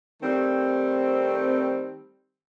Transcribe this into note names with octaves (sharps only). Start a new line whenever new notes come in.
D#3 G3 A3 C4